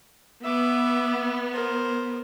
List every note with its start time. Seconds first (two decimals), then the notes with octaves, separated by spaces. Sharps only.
0.44 B3 E5 D6
1.53 A#4 C5